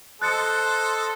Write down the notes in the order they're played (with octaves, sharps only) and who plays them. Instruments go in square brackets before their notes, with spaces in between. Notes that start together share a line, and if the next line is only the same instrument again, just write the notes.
[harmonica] A4 C5 D#5 [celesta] F#6 A6 C#7